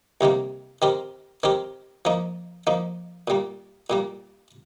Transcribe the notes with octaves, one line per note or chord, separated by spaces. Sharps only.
C2 C3 D#3 A#3
D#3 C4 G4 A#4
D#3 C4 G4 A#4
F3 A#3 D#4
F3 A#3 D#4
A#2 G3 A#3
A#2 G3 A#3